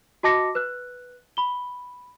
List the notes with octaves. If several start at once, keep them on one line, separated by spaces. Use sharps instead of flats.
F#4 D#5 A5 D6 A#6 C#7
B4 F#6
B5 G7